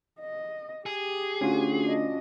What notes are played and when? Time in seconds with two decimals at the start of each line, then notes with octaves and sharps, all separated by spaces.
0.21 D#5
0.86 G4 G#4
1.41 D2 C#4 F4 F#4
1.84 D4 D#5